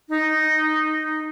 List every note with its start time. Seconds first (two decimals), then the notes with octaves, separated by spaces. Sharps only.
0.09 D#4